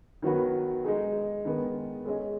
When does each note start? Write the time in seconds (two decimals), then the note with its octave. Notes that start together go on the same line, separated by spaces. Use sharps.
0.22 D#3 F#3 B3 F#4 B4
0.84 G#3 D#4 G#4
1.45 D#3 G#3 B3
2.05 G#3 C#4 G#4 D#5